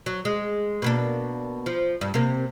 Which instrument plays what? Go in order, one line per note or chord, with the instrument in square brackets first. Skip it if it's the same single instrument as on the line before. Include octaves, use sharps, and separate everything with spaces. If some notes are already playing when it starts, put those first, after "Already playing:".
[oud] F#3
G#3
B2 A#3 D4
F3
G2
C3 A#3